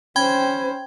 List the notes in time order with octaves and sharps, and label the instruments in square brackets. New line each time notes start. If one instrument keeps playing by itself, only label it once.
[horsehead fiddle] C#4 C5 [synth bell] G5 B5 G#6